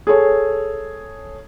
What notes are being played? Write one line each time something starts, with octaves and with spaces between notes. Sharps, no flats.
G#4 A4 C#5